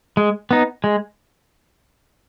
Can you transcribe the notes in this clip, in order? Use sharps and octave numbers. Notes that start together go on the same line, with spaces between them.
G#3
B3 D#4
G#3